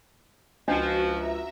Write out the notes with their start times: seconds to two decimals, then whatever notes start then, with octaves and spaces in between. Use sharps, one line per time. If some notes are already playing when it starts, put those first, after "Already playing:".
0.68 C#2 F3 C#4 D4 F#4 D#5
1.11 E5 A#5